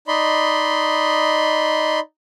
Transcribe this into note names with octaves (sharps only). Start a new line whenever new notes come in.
D#4 D5 D#5 B5 C6